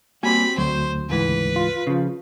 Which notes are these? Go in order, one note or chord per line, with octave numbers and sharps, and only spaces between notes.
G3 A#3 C4 F#4 G#5 B5
D2 F#3 C5
C#2 G#2 E3 B4
F4
C#3 F3